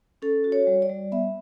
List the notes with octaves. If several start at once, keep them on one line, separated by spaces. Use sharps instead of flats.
C#4 A4
F#4
C#5
G3
D5
G3
B3 E5